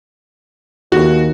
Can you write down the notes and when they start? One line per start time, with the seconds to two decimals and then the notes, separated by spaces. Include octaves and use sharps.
0.92 D#2 F#4